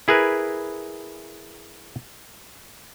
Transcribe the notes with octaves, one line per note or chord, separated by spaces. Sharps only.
E4 G#4 A#4 B4